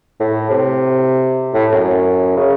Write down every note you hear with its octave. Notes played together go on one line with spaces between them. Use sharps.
A2
C3
A2
F#2
C#3